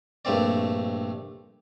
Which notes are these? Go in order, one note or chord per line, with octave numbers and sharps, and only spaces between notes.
A#1 G2 A3 C4 D5